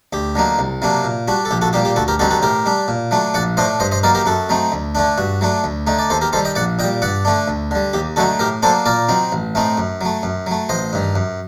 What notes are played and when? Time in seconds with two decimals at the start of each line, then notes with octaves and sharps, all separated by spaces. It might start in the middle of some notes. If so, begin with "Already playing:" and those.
0.13 D2 G4
0.35 D3 F#3 A#3 D#4
0.59 C2
0.82 C3 F#3 A#3 D4
1.04 A#2
1.28 G3 D4 F#4
1.45 A4
1.51 A#1 G4
1.62 F#4 A4
1.73 A#2 G3 A#3 G4
1.85 G4
1.96 D2 F#4 A4
2.08 G4 A#4
2.19 D3 G3 C4 D#4 F#4 A4
2.31 F#4 A4
2.42 A2 G4 A#4
2.66 G3 D4
2.88 A#2
3.11 F#3 A3 D4
3.34 A#1 D5 F#5
3.57 A2 A3 D4 C5 D#5
3.80 G2 C5 D#5
3.91 C5 D#5
4.03 F#3 A#3 D#4 A#4 D5
4.15 G4 A#4
4.26 F#2 F#4 A4
4.49 F#3 A3 C4 D#4
4.72 D2
4.95 D3 A3 D4
5.18 G2 F#4
5.41 F#3 A3 D4
5.64 D2
5.87 D3 A3 D#4
5.99 D5
6.10 D#2 A4 C5
6.21 G4 A#4
6.33 D#3 G3 A4 C5
6.45 D#5 G5
6.55 A#1 D5 F#5
6.79 A#2 D#5 G5
6.84 G3
7.02 G2 D5 F#5
7.25 D3 A3 D4
7.48 D2
7.71 D3 G3
7.93 D#2 G4
8.16 D3 F#3 A3 D#4 F#4 A4
8.39 A2 G4 A#4
8.62 F#3 A#3 D4 A4 C5
8.86 A#2 A#4 D5
9.09 F#3 C4 D#4
9.32 A1
9.55 A2 A3 C4 D#4
9.78 F#2
10.01 F#3 A3
10.23 F#2
10.47 F#3 A3
10.69 A1 C5 D#5
10.93 G2 D#3
11.16 F#2